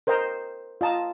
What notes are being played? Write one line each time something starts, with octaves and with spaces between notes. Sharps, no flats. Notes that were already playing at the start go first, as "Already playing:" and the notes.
A#4 C5 D#5 G5 A#5
F4 D#5 A5 A#5